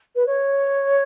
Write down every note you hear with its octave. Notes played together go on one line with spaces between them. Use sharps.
B4
C#5